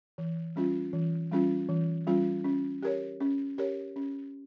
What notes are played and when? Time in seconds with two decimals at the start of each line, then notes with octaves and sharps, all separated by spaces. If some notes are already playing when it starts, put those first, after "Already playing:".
0.18 E3
0.56 G3 C#4 F4
0.93 E3
1.31 G3 C#4 F4
1.69 E3
2.07 G3 C#4 F4
2.44 C#4
2.83 G4 A#4 C#5
3.20 C#4
3.58 G4 A#4 C#5
3.96 C#4